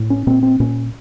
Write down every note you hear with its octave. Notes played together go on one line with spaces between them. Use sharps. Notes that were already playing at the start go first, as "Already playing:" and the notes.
Already playing: A2
C#4
A#2 C4
C4
A#2 C#4